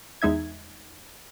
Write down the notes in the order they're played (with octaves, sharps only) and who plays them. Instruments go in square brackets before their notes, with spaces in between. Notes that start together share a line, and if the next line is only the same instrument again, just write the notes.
[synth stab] E2 G#3 D#4 E5 G#6